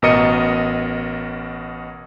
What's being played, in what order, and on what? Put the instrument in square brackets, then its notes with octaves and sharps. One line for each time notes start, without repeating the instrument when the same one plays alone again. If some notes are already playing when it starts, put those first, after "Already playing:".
[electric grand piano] A1 B2 A#4 D#5 C#7 D#7